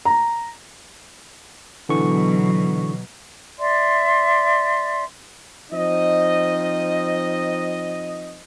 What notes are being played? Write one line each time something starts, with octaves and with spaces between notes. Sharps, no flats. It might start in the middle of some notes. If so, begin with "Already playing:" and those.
A#5
B2 D3 E3 F#3 C#6
D5 E5 C6
F3 C4 D#4 D#5